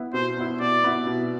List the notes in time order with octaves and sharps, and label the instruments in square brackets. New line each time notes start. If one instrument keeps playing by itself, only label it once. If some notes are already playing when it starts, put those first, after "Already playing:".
Already playing: [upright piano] B3 E4
[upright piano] B2 [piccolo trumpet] C5
[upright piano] B3 E4
[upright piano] B2 [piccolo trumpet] D5
[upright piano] B3 E4
B2